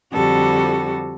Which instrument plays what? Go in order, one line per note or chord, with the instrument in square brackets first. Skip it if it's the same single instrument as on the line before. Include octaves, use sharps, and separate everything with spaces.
[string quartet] F2 D3 G3 F#4 A4